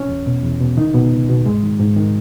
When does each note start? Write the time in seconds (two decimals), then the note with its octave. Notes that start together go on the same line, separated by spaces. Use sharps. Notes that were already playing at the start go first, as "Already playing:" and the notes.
Already playing: C#4
0.09 E2
0.27 B2
0.43 E2
0.60 B2
0.77 C#2 D#3 D#4
0.94 B2 B3
1.12 C#2
1.29 B2
1.46 G#2 G#3
1.63 D#3
1.80 G#2
1.97 D#3